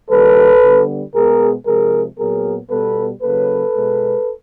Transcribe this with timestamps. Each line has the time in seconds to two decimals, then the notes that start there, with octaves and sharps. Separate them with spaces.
0.10 D#3 G3 A#3 A4 B4
0.62 D3 G3 B3
1.14 B2 G#3 B3 G#4 A#4
1.66 C3 F3 G#3 G#4 A#4
2.18 A#2 F#3 B3 G#4 A#4
2.70 B2 G3 B3 A4 B4
3.22 C#3 F#3 A#3 A4 B4
3.75 B2 G#3 B3